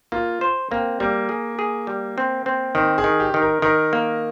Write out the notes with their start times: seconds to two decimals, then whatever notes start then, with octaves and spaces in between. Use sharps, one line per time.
0.12 A#3 F4
0.41 C5
0.71 A#3 C4
1.00 G3 A#3
1.29 G#4
1.59 G#4
1.87 G3
2.18 C4
2.46 C4
2.75 D#3 C4
2.98 G#4
3.04 D#3
3.20 G4
3.34 D#3
3.42 A#4
3.62 D#3 A#4
3.93 A#3